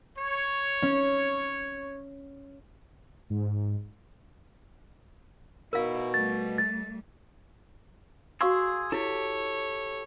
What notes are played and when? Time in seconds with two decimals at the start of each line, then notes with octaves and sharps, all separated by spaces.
0.18 C#5
0.82 C#4
3.30 G#2
5.73 B2 D#4 E4 A#4 F5
6.14 G3 A3 A6
6.58 A6
8.41 F#4 G#4 F5 C6 C#6 E6
8.92 E4 G4 A4 C#5